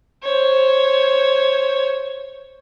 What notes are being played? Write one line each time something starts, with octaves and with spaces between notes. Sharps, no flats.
C5 C#5